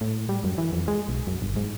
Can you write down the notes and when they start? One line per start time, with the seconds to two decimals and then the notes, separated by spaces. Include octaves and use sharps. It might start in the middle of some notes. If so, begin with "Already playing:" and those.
0.01 A2
0.29 G3
0.44 F#2
0.58 E3
0.73 F2
0.88 G#3
1.08 B1
1.27 F#2
1.42 G1
1.56 G#2